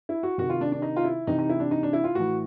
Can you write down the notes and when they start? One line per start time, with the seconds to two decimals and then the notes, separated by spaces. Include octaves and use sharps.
0.09 E4
0.23 F#4
0.38 C3 D#3 F#4
0.50 F4
0.61 D4
0.72 D4
0.82 D#4
0.96 F4
1.04 E4
1.27 C3 E3 D#4
1.39 D#4
1.49 E4
1.60 D4
1.71 D#4
1.83 D4
1.93 E4
2.04 F4
2.15 A2 E3 F#4